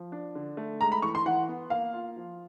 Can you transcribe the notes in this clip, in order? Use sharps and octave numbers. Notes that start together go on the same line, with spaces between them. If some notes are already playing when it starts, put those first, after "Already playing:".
Already playing: F3
D4
D3
A3
G#3 A#5
B5
E3 C#6
C6
E3 F#5
B3
A#3 F5
F4
F3